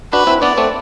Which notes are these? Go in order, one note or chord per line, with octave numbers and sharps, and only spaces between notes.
D4 F#4 B4
C4 E4
B3 D4 D5
A3 C4